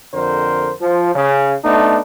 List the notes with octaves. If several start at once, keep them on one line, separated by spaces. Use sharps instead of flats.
F2 D3 A#4 C5
F3
C#3
A3 B3 D4 D#4